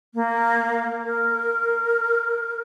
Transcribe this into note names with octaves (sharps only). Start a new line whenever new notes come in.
A#3
A#4